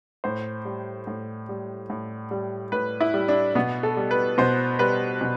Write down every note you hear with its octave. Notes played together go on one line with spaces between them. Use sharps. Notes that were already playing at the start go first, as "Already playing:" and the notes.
A2 C5
G3
A2
G3
A2
G3
A2 B4
E4
G3
D4
B2 B3
A4
G3
B4
B2 C5
G3 B4
B2